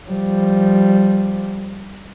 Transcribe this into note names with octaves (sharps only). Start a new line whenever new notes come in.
F3 G3